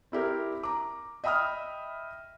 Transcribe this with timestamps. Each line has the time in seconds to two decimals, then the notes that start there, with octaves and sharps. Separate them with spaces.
0.12 C4 E4 G4 A#4
0.63 A#5 D6
1.24 D#5 E5 G5 B5 D#6 F6